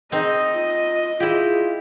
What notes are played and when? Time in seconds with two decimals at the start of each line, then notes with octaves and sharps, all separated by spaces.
0.12 C4 D#4 G#4 D#5
0.53 F4
1.20 E4 F4 G4 G#4